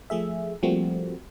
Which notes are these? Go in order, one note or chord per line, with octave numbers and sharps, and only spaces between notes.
F3 A3 G#4 E5
F3 G3 A3 A#3 C4 F#4